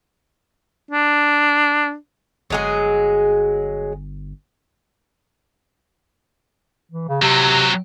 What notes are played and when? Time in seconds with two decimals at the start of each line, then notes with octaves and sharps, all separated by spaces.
0.91 D4
2.50 G1 F#3 G#3 G#4
6.91 E3
7.08 C#3
7.22 C3 F#3 C4